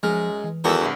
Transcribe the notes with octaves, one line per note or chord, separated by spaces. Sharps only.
F#2 F3 G#3 F6
E3
E2 D#3 E4 F#4 A4 A#4
C2 G2